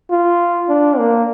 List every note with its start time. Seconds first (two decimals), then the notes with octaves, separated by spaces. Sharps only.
0.11 F4
0.69 D4
0.98 A#3